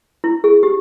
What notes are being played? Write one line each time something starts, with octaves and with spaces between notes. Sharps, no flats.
E4
G#4
G4